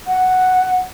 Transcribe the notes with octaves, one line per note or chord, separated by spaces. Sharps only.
F#5